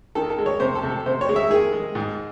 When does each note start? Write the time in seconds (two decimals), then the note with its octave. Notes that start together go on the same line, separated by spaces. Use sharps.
0.15 D#3 A4
0.30 A4
0.38 G#3
0.46 C#5
0.60 C3 C5
0.75 A4
0.83 C3
0.90 A4
1.06 C3 C5
1.21 C#5
1.29 G#3
1.36 E5
1.50 D#3 G#4
1.73 G#3
1.95 G#2